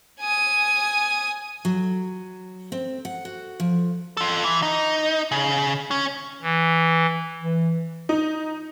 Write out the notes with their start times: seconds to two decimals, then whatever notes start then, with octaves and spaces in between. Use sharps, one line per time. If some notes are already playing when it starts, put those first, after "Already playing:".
0.20 G#5 D#6
1.65 F#3
2.72 C4
3.05 F#5
3.25 F#4
3.60 F3
4.17 F4 A4
4.44 E3
4.62 D#4
5.32 C#3
5.91 C#4
6.42 E3
7.40 E3
8.09 D#4